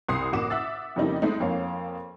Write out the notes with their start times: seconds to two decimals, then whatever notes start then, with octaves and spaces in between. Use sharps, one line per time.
0.08 C2 C6 D#6 C7
0.32 A1 A#3 F#4 D6 E7
0.50 E5 F#5 E6 A6
0.96 F2 C#3 G3 A#3 D#4 E4
1.22 G#3 A3 C4 D#4
1.40 F2 A#3 C#5 F5